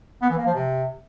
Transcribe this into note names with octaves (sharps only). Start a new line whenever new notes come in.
B3
E3
A#3
F3
C3